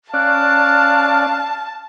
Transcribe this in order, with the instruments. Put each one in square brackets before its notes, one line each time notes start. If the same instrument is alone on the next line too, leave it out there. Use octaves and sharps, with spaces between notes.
[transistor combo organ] C#4 D5 [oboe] F5 [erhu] A5 [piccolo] F#6